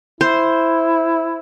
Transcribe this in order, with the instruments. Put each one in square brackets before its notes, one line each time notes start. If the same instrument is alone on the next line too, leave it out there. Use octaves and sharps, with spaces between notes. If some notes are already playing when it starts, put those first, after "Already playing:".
[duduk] E4 [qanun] C5